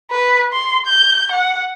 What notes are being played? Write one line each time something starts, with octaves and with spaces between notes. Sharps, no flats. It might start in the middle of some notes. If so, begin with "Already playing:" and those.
B4
C6
G6
F#5